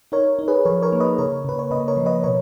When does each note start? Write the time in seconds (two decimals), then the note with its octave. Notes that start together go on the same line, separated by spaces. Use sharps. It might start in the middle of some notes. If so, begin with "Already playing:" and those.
0.12 D#4 A#4 C#5
0.39 D#4
0.48 G#4 B4
0.65 F3 A#4 C#5
0.83 A#4 C#5
0.92 A#3
1.00 B4 D#5
1.18 C#3 A#4 C#5
1.45 C#3 B4
1.59 C#5
1.70 C#3 B4 D#5
1.88 A#4 C#5
1.97 F3
2.06 B4 D#5
2.23 B2 A#4 C#5